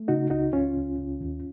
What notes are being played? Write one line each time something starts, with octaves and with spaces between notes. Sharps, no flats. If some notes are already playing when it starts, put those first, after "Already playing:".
Already playing: A3
C#3 D#4 F#4
C#2 D#4 F#4
C#2 C#4 F4
C#2
C#2
D#2